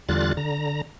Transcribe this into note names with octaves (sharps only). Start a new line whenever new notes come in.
E2 D3 G3 F4 F#6 A6
D3 A#5